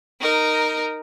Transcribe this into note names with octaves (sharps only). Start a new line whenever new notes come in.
D#4 A#4